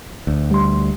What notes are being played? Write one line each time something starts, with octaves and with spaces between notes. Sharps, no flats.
D2
G3 C6